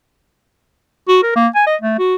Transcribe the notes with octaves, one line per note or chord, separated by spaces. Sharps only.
F#4
A#4
A#3
G#5
D#5
A3
F#4